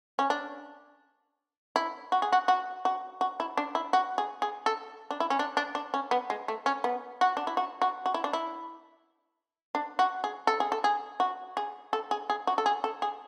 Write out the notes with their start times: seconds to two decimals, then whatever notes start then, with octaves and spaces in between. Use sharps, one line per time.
0.19 C#4
0.30 D4
1.76 E4
2.12 F#4
2.22 G#4
2.32 F#4
2.48 F#4
2.85 F#4
3.21 F#4
3.40 E4
3.57 D4
3.75 E4
3.93 F#4
4.18 G#4
4.42 G#4
4.66 A4
5.11 D4
5.20 E4
5.30 C#4
5.39 D4
5.57 D4
5.75 D4
5.94 C#4
6.11 B3
6.30 G#3
6.48 A3
6.66 C#4
6.84 B3
7.21 F#4
7.37 D4
7.47 E4
7.57 F#4
7.82 F#4
8.06 F#4
8.14 E4
8.24 D4
8.33 E4
9.75 D4
9.99 F#4
10.24 G#4
10.47 A4
10.60 G#4
10.72 A4
10.84 G#4
11.20 F#4
11.57 G#4
11.93 A4
12.11 G#4
12.30 G#4
12.47 F#4
12.58 A4
12.66 G#4
12.84 A4
13.02 G#4